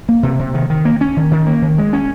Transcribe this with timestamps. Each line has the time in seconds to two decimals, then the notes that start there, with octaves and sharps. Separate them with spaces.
0.09 A#3
0.23 C3
0.39 C3
0.54 D#3
0.70 D#3
0.85 A#3
1.01 C#4
1.17 D#3
1.31 D#3
1.47 A#3
1.62 D#3
1.78 G#3
1.93 C#4